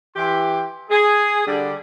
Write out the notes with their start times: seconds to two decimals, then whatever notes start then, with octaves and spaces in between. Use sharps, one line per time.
0.16 E3 G4 C6
0.90 G#4
1.46 D3 G3 D5